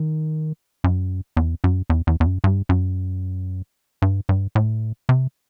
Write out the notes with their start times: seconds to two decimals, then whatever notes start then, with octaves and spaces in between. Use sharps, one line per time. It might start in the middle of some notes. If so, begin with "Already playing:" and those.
Already playing: D#3
0.84 F#2
1.37 E2
1.64 F#2
1.90 E2
2.07 E2
2.20 E2
2.26 F#2
2.44 G2
2.69 F#2
4.02 G2
4.29 G2
4.55 A2
5.09 C3